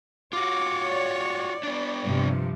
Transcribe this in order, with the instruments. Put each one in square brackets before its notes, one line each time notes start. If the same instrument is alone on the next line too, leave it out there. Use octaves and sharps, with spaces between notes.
[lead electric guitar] F4 F#4 [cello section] C#5 [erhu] D6
[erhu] D5
[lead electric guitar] B3 D4
[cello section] G2 C3 F3